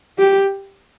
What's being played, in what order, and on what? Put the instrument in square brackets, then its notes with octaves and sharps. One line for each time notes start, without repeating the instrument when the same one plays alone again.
[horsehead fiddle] G4